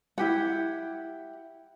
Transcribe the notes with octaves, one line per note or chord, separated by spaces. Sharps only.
E4 G4 F#5